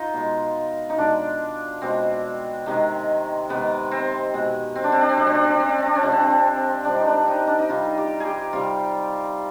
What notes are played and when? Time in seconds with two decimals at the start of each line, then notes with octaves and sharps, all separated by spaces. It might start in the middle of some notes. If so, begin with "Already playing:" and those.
Already playing: D#4 F4
0.14 B2 G#3
0.90 D#4
0.97 B2 G#3 D4
1.81 B2 G#3 C4
2.66 C3 D#3 G#3
3.49 C3 D#3 G#3 B3
3.91 C4
4.34 B2 G#3
4.75 C4
4.84 D4
4.92 C4
5.01 D4
5.09 C4
5.17 B2 G#3 D4
5.27 C4
5.35 D4
5.44 C4
5.52 D4
5.60 C4
5.69 D4
5.78 C4
5.86 D4
5.95 C4
6.02 C3 F3 G#3 D4
6.12 C4
6.19 D4
6.28 C4
6.85 C3 F3 G#3 D4
6.96 D#4
7.07 D4
7.28 D#4
7.47 D4
7.58 D#4
7.69 C3 G3 F4
7.98 G4
8.20 G4 G#4
8.53 C3 G3 F4